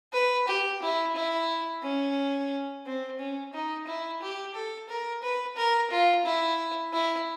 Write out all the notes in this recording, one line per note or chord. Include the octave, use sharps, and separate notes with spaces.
B4
G4
E4
E4
C#4
C4
C#4
D#4
E4
G4
A4
A#4
B4
A#4
F4
E4
E4